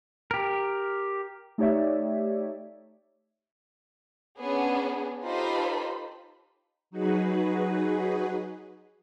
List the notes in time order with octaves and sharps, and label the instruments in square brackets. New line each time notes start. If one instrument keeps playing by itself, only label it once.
[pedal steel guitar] G4 A#4
[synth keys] A3 D#4 G4 C#5 D5 E5
[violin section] B3 C#4 D4 G#4
D#4 F4 G4 A4 C5 B5
[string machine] F#3 D#4 F#4 G#4 B4